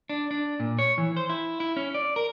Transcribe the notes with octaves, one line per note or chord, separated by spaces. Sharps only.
D4
D4
A#2
C#5
E3
C5
E4
E4
C#4
D5
A#4